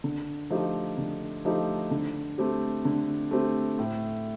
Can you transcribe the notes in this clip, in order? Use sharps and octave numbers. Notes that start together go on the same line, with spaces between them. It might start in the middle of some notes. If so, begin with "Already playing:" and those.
D3
F3 A3 D#4 G4
D3
F3 A3 D#4 G4
D3
A3 C4 G4
D3
A3 C4 G4
A2